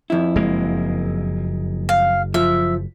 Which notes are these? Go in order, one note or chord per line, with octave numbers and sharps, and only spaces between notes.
F2 E4
F#1 G#3 A#3
F5
F3 E5